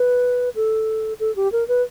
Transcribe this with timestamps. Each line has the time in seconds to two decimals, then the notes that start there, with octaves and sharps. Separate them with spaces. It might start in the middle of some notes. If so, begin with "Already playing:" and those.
Already playing: B4
0.55 A4
1.20 A4
1.36 G4
1.52 A#4
1.68 B4